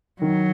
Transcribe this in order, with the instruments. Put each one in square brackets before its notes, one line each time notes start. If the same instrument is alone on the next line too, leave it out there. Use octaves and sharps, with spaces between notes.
[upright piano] D#3 [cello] F#3